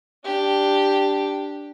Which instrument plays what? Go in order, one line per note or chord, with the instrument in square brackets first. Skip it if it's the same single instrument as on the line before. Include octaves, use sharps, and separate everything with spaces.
[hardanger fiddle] D4 G4